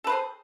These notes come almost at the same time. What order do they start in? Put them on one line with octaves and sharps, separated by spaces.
A4 B4 C5 G#4